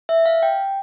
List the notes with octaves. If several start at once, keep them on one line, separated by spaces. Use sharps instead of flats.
E5
F5
G5